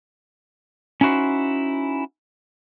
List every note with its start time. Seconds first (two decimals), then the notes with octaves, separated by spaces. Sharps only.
1.01 C#4 D#4 E4 F#4 C5